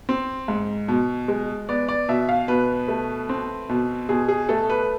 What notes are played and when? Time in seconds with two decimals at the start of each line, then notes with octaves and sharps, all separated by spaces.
0.09 C4
0.48 G#2
0.88 B2
1.28 G#3
1.69 B3 D5
1.89 D5
2.09 B2 E5
2.29 F5
2.48 B2 B4
2.88 A3
3.29 C4
3.69 B2
4.09 B2 G#4
4.28 G#4
4.49 A3 A4
4.70 B4